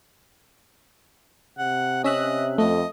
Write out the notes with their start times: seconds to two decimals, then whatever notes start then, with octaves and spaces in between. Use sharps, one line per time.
1.59 C3 F#5
2.04 C#4 D#5 E5 F#6
2.58 F2 A3 D#5